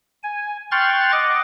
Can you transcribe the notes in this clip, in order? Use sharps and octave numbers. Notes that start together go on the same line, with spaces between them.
G#5
G5 C6 C#6 F6 F#6 A6
D#5 F#5 D6